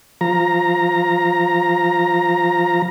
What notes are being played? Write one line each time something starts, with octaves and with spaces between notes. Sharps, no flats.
F3 A#5